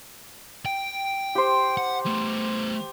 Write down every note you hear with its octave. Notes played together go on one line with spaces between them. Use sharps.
G5
G4 C5
F#5
A3 B3